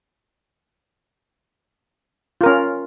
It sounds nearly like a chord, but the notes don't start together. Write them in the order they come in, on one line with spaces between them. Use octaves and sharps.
F4 A#4 C#4